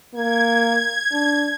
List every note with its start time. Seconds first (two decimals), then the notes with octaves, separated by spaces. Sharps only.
0.14 A#3 G#6
1.12 D4